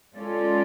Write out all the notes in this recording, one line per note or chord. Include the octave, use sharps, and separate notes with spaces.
G#3 C#4 F4 A4 D5